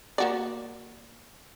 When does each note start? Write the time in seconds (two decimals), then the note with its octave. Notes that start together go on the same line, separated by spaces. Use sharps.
0.18 A#3 F#4 D5